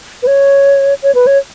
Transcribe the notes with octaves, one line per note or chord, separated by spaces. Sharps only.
B4
C#5
C#5
B4
C#5